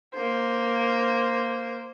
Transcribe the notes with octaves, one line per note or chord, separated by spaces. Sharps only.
A#3 C5